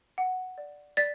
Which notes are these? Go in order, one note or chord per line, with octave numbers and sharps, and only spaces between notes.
F#5
D5
D5 A6 B6